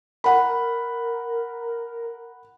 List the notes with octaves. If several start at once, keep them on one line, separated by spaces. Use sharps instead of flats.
A#4 F#5 B5